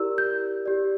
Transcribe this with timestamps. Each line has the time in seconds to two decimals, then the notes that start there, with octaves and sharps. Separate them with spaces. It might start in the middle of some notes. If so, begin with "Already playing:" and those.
Already playing: E4 G4 A#4 D5 E6
0.18 G6
0.66 G4 D5